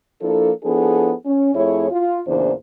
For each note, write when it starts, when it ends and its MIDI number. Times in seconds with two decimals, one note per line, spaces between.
0.21 0.50 53
0.21 0.50 58
0.21 0.50 62
0.21 0.50 64
0.21 0.50 69
0.63 1.12 53
0.63 1.12 59
0.63 1.12 62
0.63 1.12 64
0.63 1.12 68
0.63 1.12 69
1.26 1.53 61
1.54 1.87 41
1.54 1.87 57
1.54 1.87 64
1.54 1.87 68
1.54 1.87 73
1.90 2.19 65
2.26 2.51 40
2.26 2.51 46
2.26 2.51 49
2.26 2.51 52
2.26 2.51 62
2.26 2.51 72